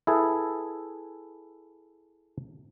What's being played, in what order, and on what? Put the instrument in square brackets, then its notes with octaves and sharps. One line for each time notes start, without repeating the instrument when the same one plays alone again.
[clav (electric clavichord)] E4 G#4 A4 B4